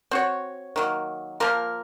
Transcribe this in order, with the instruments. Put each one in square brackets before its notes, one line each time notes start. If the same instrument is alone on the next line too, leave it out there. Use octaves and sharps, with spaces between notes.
[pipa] C4 F#4 C#5
D#3 F#3 A#3
F3 A#3 F4 A#4